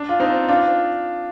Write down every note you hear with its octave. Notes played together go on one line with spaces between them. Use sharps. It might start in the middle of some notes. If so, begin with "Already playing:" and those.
Already playing: D4
F4
C4 D#4
D4 F4